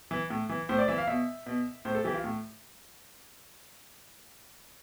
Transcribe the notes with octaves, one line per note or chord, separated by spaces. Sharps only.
E3
A2
E3
A2 C5
D5
E3 E5
F5
B2 E5
B2
A2 C5
A4
E3 G4
F4
A2